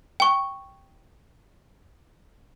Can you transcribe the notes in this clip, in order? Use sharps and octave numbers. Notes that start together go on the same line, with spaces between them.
G5 C#6